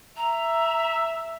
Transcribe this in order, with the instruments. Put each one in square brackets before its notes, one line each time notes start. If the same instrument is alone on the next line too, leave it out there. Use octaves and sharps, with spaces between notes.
[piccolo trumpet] E5 [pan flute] A#5